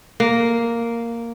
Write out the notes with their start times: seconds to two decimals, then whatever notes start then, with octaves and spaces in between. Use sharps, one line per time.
0.20 A#3